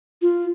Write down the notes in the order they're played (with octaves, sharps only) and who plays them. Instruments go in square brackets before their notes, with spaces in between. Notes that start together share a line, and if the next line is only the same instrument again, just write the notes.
[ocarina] F4